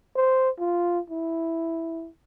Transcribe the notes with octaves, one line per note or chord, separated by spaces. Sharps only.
C5
F4
E4